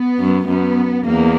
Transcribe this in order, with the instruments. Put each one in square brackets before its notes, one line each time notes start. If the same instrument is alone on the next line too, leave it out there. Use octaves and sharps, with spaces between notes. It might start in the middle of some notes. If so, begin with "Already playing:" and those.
Already playing: [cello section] B3
[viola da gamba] F#2
[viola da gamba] F#2 [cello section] B3
[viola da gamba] E2 [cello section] A#3